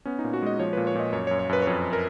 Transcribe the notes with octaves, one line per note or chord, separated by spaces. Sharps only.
B3 C#4
D#4
A#2
F#4
G#3 D#5
F3 C#5
A#2 B4
C#5
A#2 D#5
F#2 C#5
C#5
F#2
C#5
F#2 B4
C#5
F2 B4
A#4